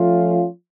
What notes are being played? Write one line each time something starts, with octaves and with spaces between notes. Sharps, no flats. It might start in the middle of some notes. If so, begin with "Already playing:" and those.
Already playing: F3 A3 C#4 F4